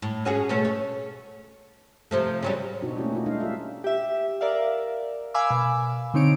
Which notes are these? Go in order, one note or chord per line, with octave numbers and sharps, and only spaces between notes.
A2
C#4 F#4 G#4
B2 A3 C#4
C#5
C3 F3 A3
C#3 F#3 G3
B2 B3 D4 D#4 F#4
A3 A#3 C#4 E4 F#4 G4
D#4 F4 D#5
G#3 D4 D#4 F5
G3 F4 A4 E5
G4 E5
A#4 D5 E5 F5
F5 G#5 B5 D6 E6
B2
D3 C4 D#4 C#5 D7